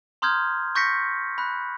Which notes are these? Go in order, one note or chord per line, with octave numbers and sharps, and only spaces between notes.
A#5 C6 D#6 F6 G6 G#6
C#6 G6 A#6 B6 C#7
B5 F#6